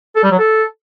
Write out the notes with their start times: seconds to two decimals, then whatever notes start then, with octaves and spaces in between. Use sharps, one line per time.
0.16 A4
0.23 G3
0.31 F#3
0.39 A4